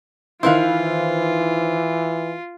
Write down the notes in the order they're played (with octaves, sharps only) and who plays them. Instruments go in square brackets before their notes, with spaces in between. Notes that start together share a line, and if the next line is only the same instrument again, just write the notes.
[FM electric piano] D#3 C5 [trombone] E3 [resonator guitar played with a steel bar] E4 B4 F5 [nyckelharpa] F4